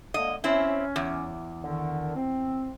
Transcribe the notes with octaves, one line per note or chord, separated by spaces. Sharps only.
D3 G#3 A#3 D#5
C4 C#4 E4
E2
D3 D#3
C4